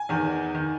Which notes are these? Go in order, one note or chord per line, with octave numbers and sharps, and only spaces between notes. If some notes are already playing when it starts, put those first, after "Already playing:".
Already playing: G#5
E2 D#3
D#3